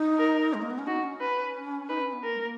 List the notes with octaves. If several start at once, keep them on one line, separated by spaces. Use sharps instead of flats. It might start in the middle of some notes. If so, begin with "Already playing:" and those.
Already playing: D#4
A#4
G#3
A#3
B3
C#4
D#4 F#4
C#4
B4
D#4 B4
C#4
B3
A#3 A#4
G#3
A#3